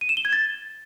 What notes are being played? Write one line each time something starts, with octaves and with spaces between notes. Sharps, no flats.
D#7
E7
G7
G#6
A6